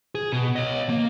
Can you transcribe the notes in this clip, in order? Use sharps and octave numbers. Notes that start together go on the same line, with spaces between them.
G#4
B2
C#5 D#5
A#3